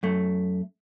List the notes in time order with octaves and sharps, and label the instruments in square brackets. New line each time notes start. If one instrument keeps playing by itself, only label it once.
[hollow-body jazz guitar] F#2 A3